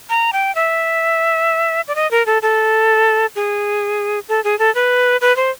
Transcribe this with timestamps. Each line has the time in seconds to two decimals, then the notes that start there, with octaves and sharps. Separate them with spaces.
0.10 A#5
0.33 G5
0.55 E5
1.88 D5
1.95 D#5
2.11 A#4
2.26 A4
2.42 A4
3.36 G#4
4.29 A4
4.44 G#4
4.59 A4
4.75 B4
5.21 B4
5.36 C5